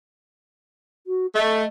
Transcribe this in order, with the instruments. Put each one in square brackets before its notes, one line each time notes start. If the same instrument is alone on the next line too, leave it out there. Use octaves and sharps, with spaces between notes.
[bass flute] F#4
[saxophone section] A3 [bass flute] D#5